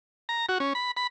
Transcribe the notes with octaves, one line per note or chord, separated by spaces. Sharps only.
A#5
F#4
C#4
B5
B5